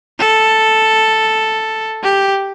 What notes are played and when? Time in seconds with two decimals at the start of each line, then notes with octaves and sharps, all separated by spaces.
0.19 A4
2.03 G4